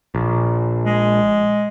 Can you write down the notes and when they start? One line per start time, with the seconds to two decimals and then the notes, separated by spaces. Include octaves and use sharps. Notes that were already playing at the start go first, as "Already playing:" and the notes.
0.15 A#1
0.85 G#3